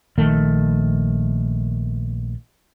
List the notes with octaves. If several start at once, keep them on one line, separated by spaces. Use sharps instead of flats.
A#1 D#3 A3